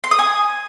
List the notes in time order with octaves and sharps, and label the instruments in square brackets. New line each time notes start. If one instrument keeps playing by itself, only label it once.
[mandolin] C6
D#6
G#5